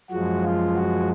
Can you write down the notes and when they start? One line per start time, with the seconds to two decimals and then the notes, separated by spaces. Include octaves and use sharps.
0.10 F#2 F3 G#3 F#4
0.44 F4
0.76 F#4